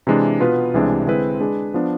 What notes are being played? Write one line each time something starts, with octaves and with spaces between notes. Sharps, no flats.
C3 E3 G#3 D4
B2 B3 F4 B4
C2 C3 E3 G#3 D4
D3 G#3 C4 E4 B4
G#3 D4 G#4 B4
F3 B3 D4